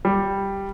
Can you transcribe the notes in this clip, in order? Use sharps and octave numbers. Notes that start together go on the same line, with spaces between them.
G3